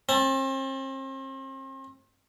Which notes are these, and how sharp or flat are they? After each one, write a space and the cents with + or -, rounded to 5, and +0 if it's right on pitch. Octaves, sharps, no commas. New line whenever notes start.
C4 +40 A5 +0